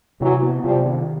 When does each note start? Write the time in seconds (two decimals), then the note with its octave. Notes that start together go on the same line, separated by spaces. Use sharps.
0.21 C3 E3 F#3
0.42 B3
0.64 C3 F3 G3
0.85 D#3